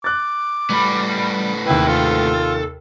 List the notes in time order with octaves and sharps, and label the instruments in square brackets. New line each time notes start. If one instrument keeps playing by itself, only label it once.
[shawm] D6 [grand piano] F#6 A6
[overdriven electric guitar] A2 B3 [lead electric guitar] G3 B5
[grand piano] D#2 C3 G5 [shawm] E4 [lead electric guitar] B4
[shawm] F4 [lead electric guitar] A4